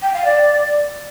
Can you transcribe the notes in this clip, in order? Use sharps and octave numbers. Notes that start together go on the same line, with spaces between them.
G5
F5
D5